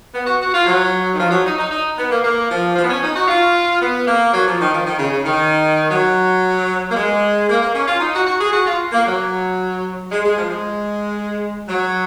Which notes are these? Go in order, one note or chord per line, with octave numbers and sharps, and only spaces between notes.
B3
F#4
F#4
F4
F#3
D#3
F3
F#3
D#4
D#4
D#4
B3
A#3
A#3
F3
F3
B3
C#4
D#4
F#4
F4
B3
A#3
F#3
F3
D#3
F3
D#3
C#3
C#3
D#3
F#3
A#3
G#3
A#3
A#3
C#4
F4
D#4
F#4
F#4
G#4
F#4
F4
A#3
F#3
G#3
G#3
F3
G#3
F#3